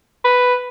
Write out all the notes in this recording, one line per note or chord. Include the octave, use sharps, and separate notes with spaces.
B4